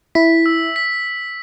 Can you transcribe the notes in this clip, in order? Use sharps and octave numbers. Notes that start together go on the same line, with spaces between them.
E4 B6
E6
B6